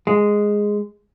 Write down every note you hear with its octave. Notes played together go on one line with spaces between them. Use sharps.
G#3